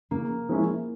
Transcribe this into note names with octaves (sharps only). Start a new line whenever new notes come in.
C#3 A#3
F3 G#3 C#4 E4